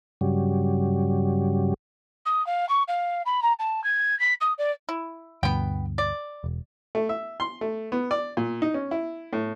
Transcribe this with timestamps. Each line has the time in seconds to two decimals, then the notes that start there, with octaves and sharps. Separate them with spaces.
0.21 G2 C#3 F#3 G3
2.26 D#6
2.47 F5
2.69 C#6
2.88 F5
3.26 B5
3.42 A#5
3.59 A5
3.84 G#6
4.19 B6
4.41 D#6
4.58 D5
4.89 E4
5.43 D2 G2 B2 B3 G5
5.98 D5
6.44 E1
6.95 A3
7.09 E5
7.40 C6
7.61 A3
7.92 B3
8.11 D5
8.37 A#2
8.62 D#4
8.74 C#4
8.91 E4
9.33 A2